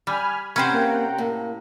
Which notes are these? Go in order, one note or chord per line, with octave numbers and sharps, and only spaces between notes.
G3 G#5 B5 F6
C3 C#4 B4 C5 F#5 G5 A#5
A#3
A2 A#3